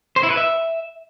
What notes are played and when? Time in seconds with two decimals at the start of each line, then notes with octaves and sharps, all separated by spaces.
0.16 C5
0.23 E4
0.30 B4
0.37 E5